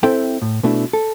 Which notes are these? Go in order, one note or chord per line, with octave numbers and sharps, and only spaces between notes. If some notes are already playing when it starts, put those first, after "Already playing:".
C4 E4 A4 E5 G5
A2
B2 A3 D4 E4
A4